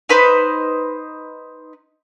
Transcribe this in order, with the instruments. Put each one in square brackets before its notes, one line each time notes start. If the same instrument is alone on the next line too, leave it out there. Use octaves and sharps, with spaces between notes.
[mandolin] D#4 B4 C5